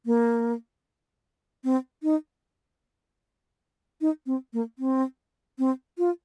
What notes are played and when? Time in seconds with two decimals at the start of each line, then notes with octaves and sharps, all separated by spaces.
0.06 A#3
1.64 C4
2.03 D#4
4.01 D#4
4.26 C4
4.53 A#3
4.79 C4
5.59 C4
5.98 F4